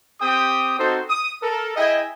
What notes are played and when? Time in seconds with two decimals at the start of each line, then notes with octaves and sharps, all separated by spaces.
0.20 C4 G4 G5 D#6
0.79 C4 D#4 F#4 A4 C5
1.09 D#6
1.42 A4 A#4
1.76 E4 G#4 D#5 E5 G5 G#5